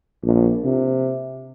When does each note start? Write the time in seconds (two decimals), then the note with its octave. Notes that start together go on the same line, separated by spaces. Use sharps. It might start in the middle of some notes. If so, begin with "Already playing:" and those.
0.23 A#1
0.65 C3